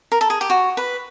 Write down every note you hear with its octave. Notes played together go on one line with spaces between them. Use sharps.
A#4
A4
G#4
G4
F#4
B4